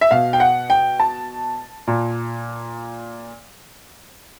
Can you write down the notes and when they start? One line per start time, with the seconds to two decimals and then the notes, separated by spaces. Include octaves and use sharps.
0.01 E5
0.11 B2 F5
0.33 G5
0.40 F#5
0.70 G5
1.00 A5
1.87 A#2